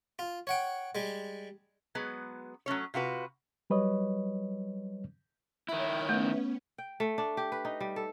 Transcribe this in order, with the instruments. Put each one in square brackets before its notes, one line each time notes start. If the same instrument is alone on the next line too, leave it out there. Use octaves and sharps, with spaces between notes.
[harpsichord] F4
C#5 F#5 G5
G3 G#3
[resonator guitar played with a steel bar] F#3 G#3 B3
F#3 A3 C#4 C#5
C3 F4 F#4 B4
[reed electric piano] F#3 G3 B4 C#5 D#5
[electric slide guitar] D#3 E4 [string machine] C#5 G5 [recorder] E5
[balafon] A3 [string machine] B3 C#4
[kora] G5
A3
D4
G4
B4
D#4
G3
A4